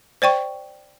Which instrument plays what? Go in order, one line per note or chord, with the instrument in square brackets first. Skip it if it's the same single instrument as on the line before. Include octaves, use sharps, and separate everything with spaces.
[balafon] C5 D5 G5 C#6